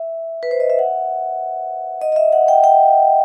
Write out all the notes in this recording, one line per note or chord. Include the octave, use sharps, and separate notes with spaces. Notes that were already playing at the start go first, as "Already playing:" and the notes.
Already playing: E5
B4
C5
D#5
E5
F#5
D#5
D#5
E5
F#5
G5
G5